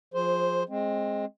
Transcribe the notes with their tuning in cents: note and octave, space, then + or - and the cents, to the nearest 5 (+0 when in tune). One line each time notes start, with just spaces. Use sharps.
F3 +20 G#4 +0 C5 +0
G#3 +0 C4 +20